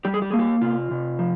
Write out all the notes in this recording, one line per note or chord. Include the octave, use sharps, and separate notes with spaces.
G3 G4
G#4
G4
A#3 G#4
G4
C3 F4
C3
F3